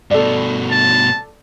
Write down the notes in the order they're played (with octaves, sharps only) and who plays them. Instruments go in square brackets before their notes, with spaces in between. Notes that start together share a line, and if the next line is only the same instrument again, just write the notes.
[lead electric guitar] G2 B2 [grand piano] A4 D5
[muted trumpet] A5